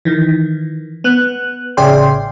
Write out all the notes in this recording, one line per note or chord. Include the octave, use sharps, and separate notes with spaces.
D#3 E3
B3 F#6
A1 C#3 G#4 D5 G5 C6